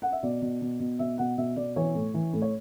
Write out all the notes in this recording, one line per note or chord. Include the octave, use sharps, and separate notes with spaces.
F#5
E5
B2 D5
B2
B2
B2
B2 E5
B2 F#5
B2 E5
B2 D5
E3 C#5
A2
E3
A2
C#5